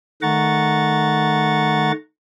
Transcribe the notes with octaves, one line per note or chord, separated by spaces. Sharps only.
D#3 A3 F#5 A#5 C#6 A6